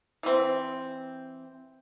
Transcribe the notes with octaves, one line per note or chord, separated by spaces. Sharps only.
E3 C4